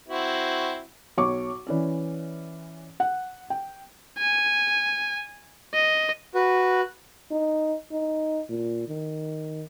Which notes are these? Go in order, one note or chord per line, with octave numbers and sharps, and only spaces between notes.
C4 E4 F#4
B1 C#5 C#6 D6
E3 C#4 D5
F#5
G5
G#5
D#5
F#4 B4
D#4
D#4
A#2
D#3